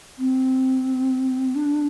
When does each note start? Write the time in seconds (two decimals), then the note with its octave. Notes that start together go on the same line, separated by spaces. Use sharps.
0.18 C4
1.55 D4